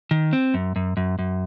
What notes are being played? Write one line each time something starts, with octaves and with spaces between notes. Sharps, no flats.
D#3
C4
F#2
F#2
F#2
F#2